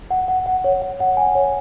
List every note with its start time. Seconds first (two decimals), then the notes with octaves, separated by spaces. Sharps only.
0.11 F#5
0.28 F#5
0.46 F#5
0.64 C#5
0.82 F#5
1.00 F#5
1.17 G#5
1.35 C#5